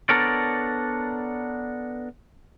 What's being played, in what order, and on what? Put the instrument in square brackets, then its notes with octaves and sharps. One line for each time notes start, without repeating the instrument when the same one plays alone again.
[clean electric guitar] B3 D4 A4 A#4 C#5 D5